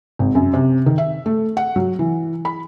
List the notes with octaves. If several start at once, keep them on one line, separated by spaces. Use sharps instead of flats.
G#1
F#2
C3
D#3
E5
A3
F#5
F#3
E3
B5